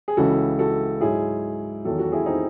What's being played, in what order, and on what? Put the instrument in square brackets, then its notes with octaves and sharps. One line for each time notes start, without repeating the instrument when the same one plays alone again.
[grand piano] G#4
C#2 C#3 E3 F#4 A4
F#4 A4
G#2 F#3 E4 G#4
E2 D#3 F#3 F#4 A4
F#4 A4
E4 G#4
C4 D#4